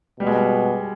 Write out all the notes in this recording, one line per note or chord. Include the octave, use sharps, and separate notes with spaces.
B2 G3
G#3
G3